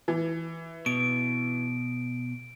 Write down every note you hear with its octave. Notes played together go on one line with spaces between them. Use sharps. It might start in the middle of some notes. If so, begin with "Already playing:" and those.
E3
B2 D7